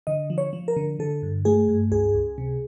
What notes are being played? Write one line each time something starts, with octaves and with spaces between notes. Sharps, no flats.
D3 D#5
F3
C#5
F3
A#4
D3
D3 A4
G2
A3 G#4
G2
C#2 G#4
C#2
C3